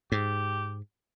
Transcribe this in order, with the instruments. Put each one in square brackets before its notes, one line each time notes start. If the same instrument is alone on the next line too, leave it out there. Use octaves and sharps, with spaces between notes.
[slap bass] G#2 [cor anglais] G4